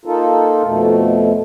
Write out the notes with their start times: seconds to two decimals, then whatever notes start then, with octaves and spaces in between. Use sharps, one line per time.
0.05 A#3 D#4 F4 A4
0.65 F2 B2 A3